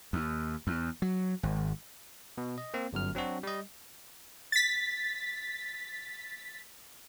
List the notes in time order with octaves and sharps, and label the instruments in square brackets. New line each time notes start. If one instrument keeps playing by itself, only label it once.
[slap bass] D#2
E2
F#3
G#1
[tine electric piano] B2
D#5
A#3 C4
G1 F#2 F6
F#3 C4 D4 F#4
G3 D#5
[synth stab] A6 B6